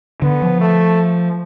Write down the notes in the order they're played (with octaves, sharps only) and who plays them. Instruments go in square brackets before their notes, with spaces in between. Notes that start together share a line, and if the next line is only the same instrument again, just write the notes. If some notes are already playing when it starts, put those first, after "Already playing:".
[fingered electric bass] D3 [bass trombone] B3
[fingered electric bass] F3
[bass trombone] A3